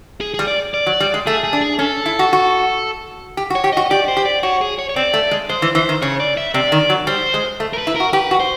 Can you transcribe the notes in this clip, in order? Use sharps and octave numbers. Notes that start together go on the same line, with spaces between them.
G#4
G#4
G3
D5
D5
F#3
G3
G#3
A3 G#4
G#4
D4
G#4
C#4 A4
E4
F#4
F#4
G4
F#4
C#5
G4
F#4 D#5
G4 D5
C5
G4
D5
F#4 C#5
G#4
C#5
C#5
C4 D5
A3
G#3
G#3 C5
E3
E3 C5
D#3
C#3 C#5
D5
E5
C3 D5
D#3
F#3
G3 C5
G#3
A3
A#4
B4
E4
F#4 A#4
G4 B4
F#4
C5